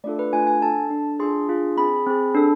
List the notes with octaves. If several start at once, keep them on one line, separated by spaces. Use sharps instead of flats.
A3 D4 F4 A4 D5
B4
A3 D4 F4 A4 G#5
G#5
D4 A4 A5
D4 A4
D4 F4 G#4 C6
D4 F4 G#4
C4 G#4 B5
C4 G#4
D4 A4